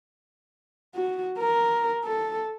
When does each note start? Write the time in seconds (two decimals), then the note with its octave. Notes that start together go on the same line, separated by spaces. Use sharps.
0.95 F#4
1.38 A#4
2.04 A4